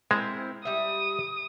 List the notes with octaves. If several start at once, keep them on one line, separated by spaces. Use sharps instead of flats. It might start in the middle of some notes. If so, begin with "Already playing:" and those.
G#3 C4 E4 A#4
G3 E5 D#6